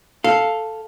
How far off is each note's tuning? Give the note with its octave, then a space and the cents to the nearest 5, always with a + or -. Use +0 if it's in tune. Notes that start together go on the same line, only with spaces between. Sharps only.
A4 +0 F5 +0